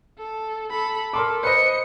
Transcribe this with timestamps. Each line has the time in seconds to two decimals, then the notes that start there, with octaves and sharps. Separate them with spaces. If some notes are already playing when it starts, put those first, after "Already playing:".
0.18 A4
0.71 A4 B5
1.13 A4 A#4 C6 D6
1.43 B4 C5 D#5 C#7